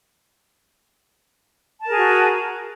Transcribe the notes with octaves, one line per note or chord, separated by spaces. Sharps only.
F#4 G#4 A#4 A5